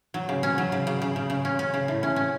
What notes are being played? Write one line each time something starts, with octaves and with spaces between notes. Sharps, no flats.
F#3
C#3
C#4
F#3
C#3
C#3
C#3
C#3
C#3
C#4
C#4
C#3
A2
C#4
C#4